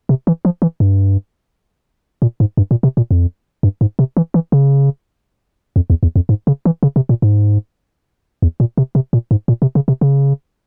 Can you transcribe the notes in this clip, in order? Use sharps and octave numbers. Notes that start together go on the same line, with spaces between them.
C3
E3
F3
E3
G2
A#2
G#2
G2
A#2
C3
A#2
F2
G2
G#2
C3
E3
E3
C#3
F2
E2
E2
F2
G#2
C#3
E3
C#3
C3
A#2
G#2
E2
A#2
C3
C3
A#2
G#2
A#2
C3
C#3
C3
C#3